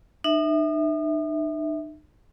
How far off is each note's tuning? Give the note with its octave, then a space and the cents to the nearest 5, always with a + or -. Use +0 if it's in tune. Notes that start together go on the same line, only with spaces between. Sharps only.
D#4 -40 E5 -15